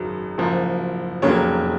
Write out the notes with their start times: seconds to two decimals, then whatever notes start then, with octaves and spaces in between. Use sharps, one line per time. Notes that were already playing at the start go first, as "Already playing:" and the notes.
Already playing: G#1 F#2 C#3 F#3
0.38 F#1 F#2 F3
1.22 F1 F2 C#3 F#3 A#3 C#5